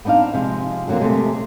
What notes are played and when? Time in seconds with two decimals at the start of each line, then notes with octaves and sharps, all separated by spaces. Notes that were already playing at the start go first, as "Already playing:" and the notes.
0.05 B3 C4 D4 D#4 F5
0.34 C3 F3 G#3
0.88 D3 F#3 G#3 A#3 C4
1.01 C3 G#3 A3